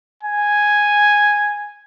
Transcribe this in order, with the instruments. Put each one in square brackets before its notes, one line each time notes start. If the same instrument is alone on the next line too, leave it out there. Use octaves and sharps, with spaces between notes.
[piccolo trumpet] G#5